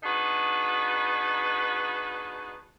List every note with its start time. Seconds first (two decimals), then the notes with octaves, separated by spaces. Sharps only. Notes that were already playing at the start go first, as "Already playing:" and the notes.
0.03 B3 D4 D#4 F#4 G#4 B4